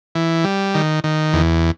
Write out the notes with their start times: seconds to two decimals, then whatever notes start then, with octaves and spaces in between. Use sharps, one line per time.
0.15 E3
0.44 G3
0.75 D#3
1.04 D#3
1.33 E2